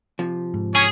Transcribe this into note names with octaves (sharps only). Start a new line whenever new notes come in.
C3 F3
G#2
C#4 G#4 C#5 G#5